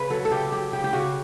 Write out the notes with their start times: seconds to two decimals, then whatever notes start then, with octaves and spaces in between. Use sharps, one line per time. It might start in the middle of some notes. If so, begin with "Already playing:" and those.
Already playing: C#3 B4
0.10 F#3 A4
0.25 A4
0.31 C#3 G4
0.52 F#3 G4
0.73 C#3 G4
0.84 G4
0.93 C#3 F#4